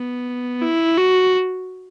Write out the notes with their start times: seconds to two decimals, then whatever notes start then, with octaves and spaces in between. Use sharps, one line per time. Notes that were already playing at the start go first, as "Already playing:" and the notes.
Already playing: B3
0.62 E4
0.98 F#4